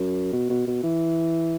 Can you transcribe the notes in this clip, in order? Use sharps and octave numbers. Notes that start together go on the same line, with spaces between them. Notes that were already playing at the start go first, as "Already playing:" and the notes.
Already playing: F#2
B2
B2
B2
E3